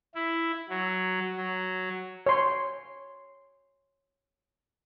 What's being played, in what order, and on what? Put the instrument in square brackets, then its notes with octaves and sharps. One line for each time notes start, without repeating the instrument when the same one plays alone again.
[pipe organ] E4
F#3
F#3
[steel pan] C#5 C6